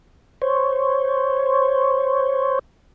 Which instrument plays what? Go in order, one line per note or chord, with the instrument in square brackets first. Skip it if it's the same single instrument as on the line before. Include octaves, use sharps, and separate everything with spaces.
[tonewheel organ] C5 C#5